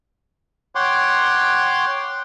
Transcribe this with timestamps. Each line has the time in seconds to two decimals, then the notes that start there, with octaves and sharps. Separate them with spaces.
0.75 C#5 F#5 G5 C6 D6